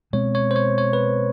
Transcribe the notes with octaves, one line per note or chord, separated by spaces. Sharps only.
B2 G#3 C4 C#5
C#5
C5
C#5
C#5
B4